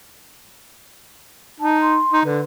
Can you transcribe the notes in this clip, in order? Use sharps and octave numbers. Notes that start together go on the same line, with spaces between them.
D#4 A5
C6
D#4
D3 B4